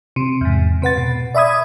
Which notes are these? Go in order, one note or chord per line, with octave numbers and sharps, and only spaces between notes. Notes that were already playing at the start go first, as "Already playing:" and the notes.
C3
E2 G#2
C3 B4 F#5 A6
B2
D5 E5 B5 D#6 G#6